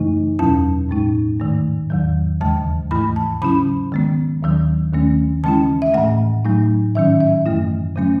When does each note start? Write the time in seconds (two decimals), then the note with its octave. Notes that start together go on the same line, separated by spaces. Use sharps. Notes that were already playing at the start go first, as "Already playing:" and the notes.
Already playing: F#2 C#3 E3 A3 D#4
0.39 E2 B2 F#3 C#4 E4 A5
0.89 A2 G#3 D#4
1.40 G#2 D#3 A3
1.90 E2 D#3 F#3
2.41 D#2 C#3 E3 G#3 A5
2.91 G#2 E3 A3 E4 B5
3.16 A5
3.41 C#3 F#3 C#4 E4 B5
3.92 D#3 G#3 B3
4.42 D#2 D#3 F#3
4.93 D#2 D#3 A3 C#4
5.44 C#3 E3 G#3 C#4 E4 A5
5.82 E5
5.94 A2 E3 A3 F#5
6.45 A2 F#3 A3 D#4
6.95 G#2 D#3 F#3 C#4 E5
7.20 E5
7.46 F#2 E3 A3 E4
7.96 C#3 F#3 A3 C#4